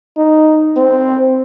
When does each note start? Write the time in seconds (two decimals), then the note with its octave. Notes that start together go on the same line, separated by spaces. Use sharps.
0.17 D#4
0.77 C4